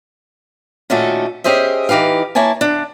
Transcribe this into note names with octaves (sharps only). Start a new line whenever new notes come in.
A#2 D#3 A3 C#4 F#4 A4
C#4 G4 G#4 C5 D#5 E5
E3 D#4 G4 B4 F5
A#3 E4 C#5 G#5 A5
D3 D4